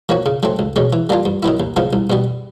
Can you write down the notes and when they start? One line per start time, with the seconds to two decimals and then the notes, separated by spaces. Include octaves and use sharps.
0.09 F3 A#3 C#4 F#4
0.26 C#3
0.43 F#3 A3 C4
0.59 C#2
0.76 B2 G#3 C#4
0.93 E3
1.09 G3 A#3 D4 F4
1.25 G2
1.43 D#3 F#3 B3 E4
1.60 D#2
1.76 C#3 F3 G#3 B3
1.93 C2
2.10 B2 G3 B3